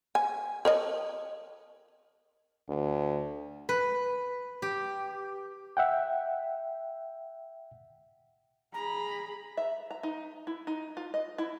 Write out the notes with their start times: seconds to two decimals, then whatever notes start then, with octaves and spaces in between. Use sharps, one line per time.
0.15 G#5
0.65 A#4 C#5 D#5
2.69 D2
3.69 B4
4.62 G4
5.77 E5 F#5 G5
8.74 G#4 A#5 B5
9.57 E5
9.91 A#5
10.03 D#4
10.47 E4
10.67 D#4
10.97 F4
11.14 D#5
11.38 E4